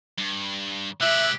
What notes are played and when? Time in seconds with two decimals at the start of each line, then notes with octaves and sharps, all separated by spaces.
0.18 G2
1.01 C3 G#3 G4 E5 F#6